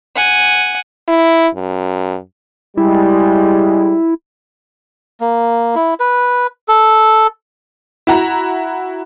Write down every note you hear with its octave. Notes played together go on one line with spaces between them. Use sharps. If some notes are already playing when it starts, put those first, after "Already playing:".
F#5 G#5
E4
F#2
G3 G#3 E4
A#3
E4
B4
A4
E4 F#4 A#5